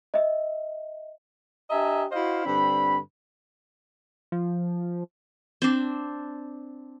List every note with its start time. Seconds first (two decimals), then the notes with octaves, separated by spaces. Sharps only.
0.14 D#5 E5
1.70 D4 G4 D#5 E5 G#5 A#5
2.12 E4 F#4 C5 D#5 F5
2.45 G2 D3 C4 D4 B5
4.32 F3
5.62 C4 D4